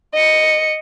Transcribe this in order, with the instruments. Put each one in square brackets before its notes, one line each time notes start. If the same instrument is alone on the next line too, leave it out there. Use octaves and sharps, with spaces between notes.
[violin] D#5 C#7